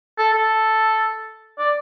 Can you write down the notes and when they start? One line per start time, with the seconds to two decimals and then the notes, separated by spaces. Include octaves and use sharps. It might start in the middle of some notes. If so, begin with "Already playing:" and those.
0.18 A4
0.33 A4
1.59 D5